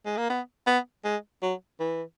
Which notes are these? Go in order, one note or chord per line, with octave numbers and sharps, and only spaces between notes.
G#3
A#3
B3
B3
G#3
F#3
E3